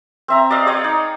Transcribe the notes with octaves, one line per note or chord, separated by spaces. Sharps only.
C4 E5 A#5
D5 D#5 F5
G#4 C#5 D5 G5
D#4